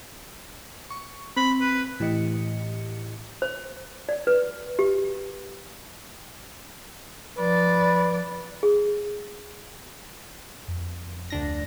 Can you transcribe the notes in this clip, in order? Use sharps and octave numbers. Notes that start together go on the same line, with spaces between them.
C#6
C4 B5
B4
A2 E3 G4 D#5 C#7
C5
D5
B4
G4
F3 B4 D5
G#4
F2
D2 D4 A#6